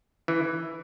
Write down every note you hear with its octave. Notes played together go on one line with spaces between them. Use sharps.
E3